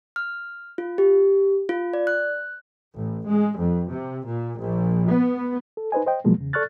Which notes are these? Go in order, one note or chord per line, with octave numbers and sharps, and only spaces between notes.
F6
F4
G4
F4
D5
F#6
A1
G#3
F2
C3
A#2
A#1
B3
A4
D#4 B4 C5 D#5 G#5
C5 D#5 G5
B2 F3 F#3 G#3 A#3
E2 C#3
A4 D5 C#6 F6 F#6 A6